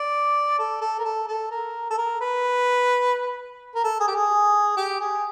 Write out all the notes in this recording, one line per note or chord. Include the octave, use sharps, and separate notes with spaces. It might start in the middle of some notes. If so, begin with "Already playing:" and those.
Already playing: D5
A4
A4
A#4
A4
A4
A#4
A4
A#4
B4
A#4
A4
G#4
G4
G#4
G4
G#4